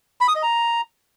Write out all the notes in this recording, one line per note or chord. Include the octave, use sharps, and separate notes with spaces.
B5
D#6
D#5
A#5